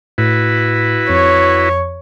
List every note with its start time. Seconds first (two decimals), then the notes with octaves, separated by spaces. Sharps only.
0.18 A2 E4 F#4 B4
1.09 F2 C#5